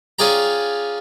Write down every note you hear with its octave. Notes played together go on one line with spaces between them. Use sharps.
C#4 F4 G#4 D5 G5 A#5